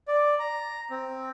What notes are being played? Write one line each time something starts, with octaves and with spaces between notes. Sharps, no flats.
D5
A#5
C4